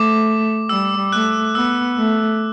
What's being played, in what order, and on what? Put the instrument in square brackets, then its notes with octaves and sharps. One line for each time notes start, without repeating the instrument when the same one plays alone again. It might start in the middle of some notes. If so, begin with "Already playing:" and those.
Already playing: [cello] A3 [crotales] D6
[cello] G3 [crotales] E6
[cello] A3 [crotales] F#6
[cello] B3 [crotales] E6
[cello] A3